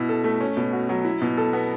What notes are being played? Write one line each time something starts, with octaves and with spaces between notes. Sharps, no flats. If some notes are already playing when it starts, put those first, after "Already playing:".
Already playing: B2 E4
A4
A3
C#4
B2
F#4
F#3
E4
B2
A4
B3